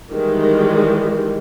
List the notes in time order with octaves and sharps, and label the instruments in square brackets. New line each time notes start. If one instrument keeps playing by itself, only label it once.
[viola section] D#3 E3 G3 G#3